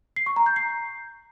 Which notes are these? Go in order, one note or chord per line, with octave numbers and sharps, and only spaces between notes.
C7
C#6
A#5
G6
C7